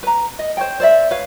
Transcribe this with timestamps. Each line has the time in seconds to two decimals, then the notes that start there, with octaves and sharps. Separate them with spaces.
0.03 B4 A#5
0.39 D#5
0.57 C5 C#5 G5
0.80 C5 D5 E5
1.11 B4 C#5 F5